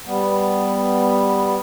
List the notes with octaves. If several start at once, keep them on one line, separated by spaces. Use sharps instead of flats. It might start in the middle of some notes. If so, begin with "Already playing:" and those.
G3 B3